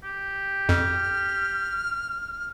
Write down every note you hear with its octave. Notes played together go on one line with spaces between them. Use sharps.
G4
F2 F6